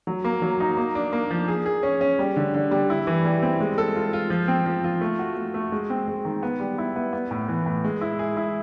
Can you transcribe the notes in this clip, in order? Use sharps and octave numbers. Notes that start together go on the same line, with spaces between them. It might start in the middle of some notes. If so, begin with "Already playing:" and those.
F#3
A#3
F#3
D#4
A#3
D4
A#3
F3
G#4
G#4
C#4
C#4
G3
D3
D3
G3
E4
E3
G3
C4
G#3
A4
F4
F4
F3
C4
F3
F4
A3
F#4
A3
A3
G#3
C4
G#3
D#3
B3
G3
E4
B3
B3
A2
E3
A2
G#3
E4
G#4
E4